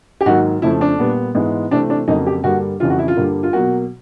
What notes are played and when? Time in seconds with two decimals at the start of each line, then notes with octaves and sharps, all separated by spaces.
0.21 G4
0.26 G#2 D#3 F#3 A#3 F#4
0.62 F2 C#3 F3 A3 E4
0.81 D4
0.99 A#2 G3 B3
1.35 G#2 E3 G#3 B3
1.71 C3 E3 A3 C4 D4
1.90 D4
2.07 F2 C#3 F#3 A#3 D#4
2.26 G4
2.44 G2 D3 G3 A#3 F#4
2.80 F2 C#3 E3 G3 F4
2.90 F#4
2.99 E4
3.08 F4
3.16 G2 D3 G3 A#3
3.43 F4
3.53 B2 F#3 A#3 F#4